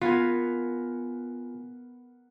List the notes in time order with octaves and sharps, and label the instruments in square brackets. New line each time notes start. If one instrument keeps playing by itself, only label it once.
[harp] B3 A#4 G#5 [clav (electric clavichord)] F4